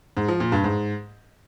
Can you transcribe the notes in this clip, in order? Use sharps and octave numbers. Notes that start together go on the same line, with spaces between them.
G#2
F3
A#2
G2
G#2